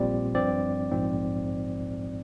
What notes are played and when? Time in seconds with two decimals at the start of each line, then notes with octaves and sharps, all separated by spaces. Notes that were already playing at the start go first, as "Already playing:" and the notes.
Already playing: A#1 A#2 G3 C4 D5
0.34 G2 F3 C4 D5
0.91 A#1 G#2 F3 C4